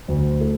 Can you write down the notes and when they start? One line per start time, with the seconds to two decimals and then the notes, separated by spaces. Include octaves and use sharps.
0.08 D2
0.41 A3